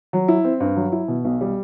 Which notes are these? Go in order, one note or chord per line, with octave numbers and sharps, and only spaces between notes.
F#3
E4
C4
G2
F#3
E4
B2
B1
G3